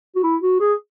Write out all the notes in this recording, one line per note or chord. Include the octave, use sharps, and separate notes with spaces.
F#4
E4
F#4
G#4